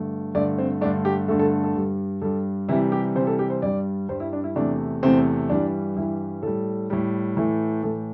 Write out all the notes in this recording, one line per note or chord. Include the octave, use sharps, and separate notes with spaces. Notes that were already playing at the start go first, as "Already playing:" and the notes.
Already playing: G2 D3 A3
G2 D3 A3 D5
C4
G2 D3 A3 D4
G4
G2 D3 A3 A4
A4
A4
G2 G3
G2 G3 A4
C3 E3 G3 E4
G4
C3 E3 G3 C5
A4
G4
C5
G2 G3 D5
G2 G3 C5
E4
D4
E4
E2 C3 A3 D4
E2 C3 A3 C4
G2 E3 G3 D4
G2 E3 G3 E4
A2 G3 A4
A2 G3
A2 E3 A3
A2 E3 A3 A4